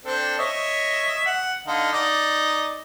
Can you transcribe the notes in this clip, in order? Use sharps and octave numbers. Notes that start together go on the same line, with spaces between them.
C4 D4 A4
C#5 D#5 E5
F#5
D3 D#4 F5
D#4 D5